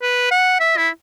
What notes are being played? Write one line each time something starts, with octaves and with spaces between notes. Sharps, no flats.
B4
F#5
E5
E4